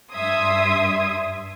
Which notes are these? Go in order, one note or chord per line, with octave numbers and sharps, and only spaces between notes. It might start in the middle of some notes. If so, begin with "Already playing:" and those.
G2 E5 C6 D#6 G#6